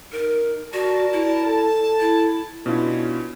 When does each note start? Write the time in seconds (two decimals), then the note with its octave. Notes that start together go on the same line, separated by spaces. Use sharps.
0.12 D#4 A#4
0.73 F#4 A#4 D5 A5
1.13 E4
1.45 A4 A5
2.00 E4
2.66 B2 C#4 D4 E4 F4